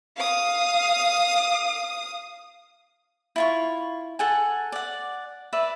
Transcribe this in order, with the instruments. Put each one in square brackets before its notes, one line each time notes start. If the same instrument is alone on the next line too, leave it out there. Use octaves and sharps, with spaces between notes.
[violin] F5 D#6
[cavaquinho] E4 F4 C#6
A4 F#5 G#5
D5 F#5
B4 D5 E5